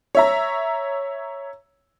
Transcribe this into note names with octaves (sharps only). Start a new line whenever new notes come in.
C#5 E5 A#5